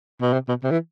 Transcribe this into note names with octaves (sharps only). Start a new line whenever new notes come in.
B2
C3
B2
C3
E3